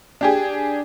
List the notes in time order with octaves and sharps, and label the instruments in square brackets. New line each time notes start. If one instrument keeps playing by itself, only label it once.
[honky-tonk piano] D4 G4 G#4